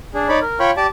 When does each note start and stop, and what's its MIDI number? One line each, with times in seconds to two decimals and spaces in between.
0.14 0.28 62
0.14 0.28 68
0.29 0.39 63
0.29 0.39 73
0.29 0.39 74
0.29 0.39 83
0.41 0.59 70
0.60 0.71 65
0.60 0.71 73
0.60 0.71 79
0.60 0.71 83
0.60 0.71 85
0.77 0.87 67
0.77 0.87 74
0.77 0.87 81
0.77 0.87 86